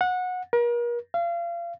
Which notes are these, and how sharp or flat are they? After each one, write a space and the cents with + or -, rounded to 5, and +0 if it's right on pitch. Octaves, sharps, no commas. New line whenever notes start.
F#5 -20
A#4 +40
F5 -30